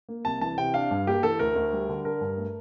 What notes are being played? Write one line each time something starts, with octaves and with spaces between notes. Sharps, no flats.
A#3
C2 A5
E3 A5
C3 G5
D4 F5
G2
A#3 G4
E3 A4
D2 A#4
D2
G3
D3
D4 A#4
G2
A3